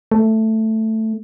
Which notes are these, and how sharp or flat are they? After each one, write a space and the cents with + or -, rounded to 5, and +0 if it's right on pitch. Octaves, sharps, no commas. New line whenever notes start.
A3 +5